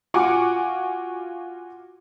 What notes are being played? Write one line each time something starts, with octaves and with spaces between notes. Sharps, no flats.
F4 F#4 F#5 G#5 C#6 D6